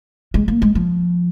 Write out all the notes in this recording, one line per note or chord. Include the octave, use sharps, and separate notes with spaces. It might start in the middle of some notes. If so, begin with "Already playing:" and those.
G#3
A#3
G#3
F3